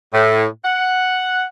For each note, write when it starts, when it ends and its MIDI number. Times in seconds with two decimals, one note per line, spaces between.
0.13 0.45 45
0.64 1.44 78